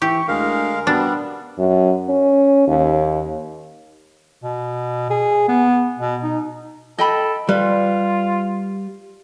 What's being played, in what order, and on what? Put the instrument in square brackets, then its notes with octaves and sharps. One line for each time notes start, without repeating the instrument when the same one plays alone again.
[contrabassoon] E3 [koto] G4 [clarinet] C#6
[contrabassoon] D2 [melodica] G#3 F5 [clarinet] A#4
[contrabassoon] B2 [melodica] G3 B3 [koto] D4
[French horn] F#2
C#4
D#2
[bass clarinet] B2
G#4
B3
B2
D#4
[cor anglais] A4 [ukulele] D#5 G5 B5
[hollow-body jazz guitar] G3 [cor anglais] F4 [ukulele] B4